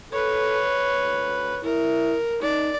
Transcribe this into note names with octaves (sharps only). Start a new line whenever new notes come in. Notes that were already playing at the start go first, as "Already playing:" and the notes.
A4 B4 C#5
D2
E4 A#4
D#4 D5